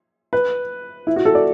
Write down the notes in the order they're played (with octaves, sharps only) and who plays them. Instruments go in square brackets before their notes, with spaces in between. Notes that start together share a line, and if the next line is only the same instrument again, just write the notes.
[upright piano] B4
E4
F#4
A4
D5